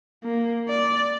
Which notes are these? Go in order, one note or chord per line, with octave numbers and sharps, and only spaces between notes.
A#3
D5